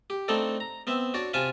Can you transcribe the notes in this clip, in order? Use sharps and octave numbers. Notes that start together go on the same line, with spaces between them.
G4
A3 C4 D4 D#4 A4
A#5
B3 C4 E5
D4 F#4 C#5 D5
C3 F4 F5 G#5 A5 B5